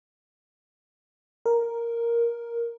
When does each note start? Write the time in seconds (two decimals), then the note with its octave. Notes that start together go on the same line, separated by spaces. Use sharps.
1.46 A#4